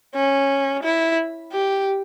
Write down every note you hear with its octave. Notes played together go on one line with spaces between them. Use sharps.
C#4
E4
G4